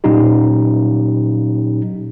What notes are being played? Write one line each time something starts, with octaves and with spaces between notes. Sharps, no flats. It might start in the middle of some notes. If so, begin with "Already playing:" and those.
A#2 F#3 C#4 D#4 G4